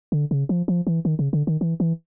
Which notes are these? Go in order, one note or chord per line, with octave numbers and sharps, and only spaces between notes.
D3
C#3
F3
F3
E3
D#3
C#3
D3
D#3
E3
E3